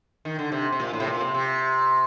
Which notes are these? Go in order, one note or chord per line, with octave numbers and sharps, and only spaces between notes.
D#3
D3
C3
C3
A#2
A2
C3
A#2
C3
C3